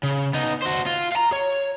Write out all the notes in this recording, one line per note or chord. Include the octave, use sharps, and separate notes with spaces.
C#3
B3 D#4
F#4 C5
F4
F5 A#5
C#5